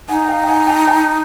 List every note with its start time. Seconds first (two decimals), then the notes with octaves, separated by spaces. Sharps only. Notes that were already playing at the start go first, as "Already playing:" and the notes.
0.08 D#4 F#5 G#5
0.25 F#5
0.28 F5 G5
0.43 G5
0.48 F#5 G#5
0.67 G5 A5
0.87 G5 A5